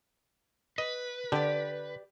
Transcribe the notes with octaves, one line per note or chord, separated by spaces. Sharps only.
B4 D#5
D3 G4 D5